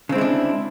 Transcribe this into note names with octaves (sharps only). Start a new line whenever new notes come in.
C#3 G#3 C4 D4 E4